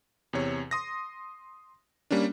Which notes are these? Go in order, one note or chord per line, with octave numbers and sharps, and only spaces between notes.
E2 C3 C#5
C6 D#6 A#6
G3 A#3 C#4 D4